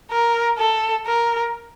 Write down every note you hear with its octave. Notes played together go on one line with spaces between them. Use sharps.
A#4
A4
A#4